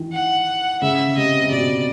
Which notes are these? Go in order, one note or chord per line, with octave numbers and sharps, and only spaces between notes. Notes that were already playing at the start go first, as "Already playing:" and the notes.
Already playing: D#3 E3
F#5
C#3 E5
C3 D#5
C3
B2 D5